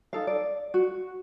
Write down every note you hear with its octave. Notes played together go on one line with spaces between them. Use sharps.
D#4 A4 F5
D5
F#4